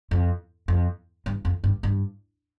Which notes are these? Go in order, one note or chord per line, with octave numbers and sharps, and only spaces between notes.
F2
F2
G2
F2
G2
G2